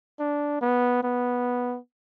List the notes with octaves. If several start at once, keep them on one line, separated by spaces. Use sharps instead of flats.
D4
B3
B3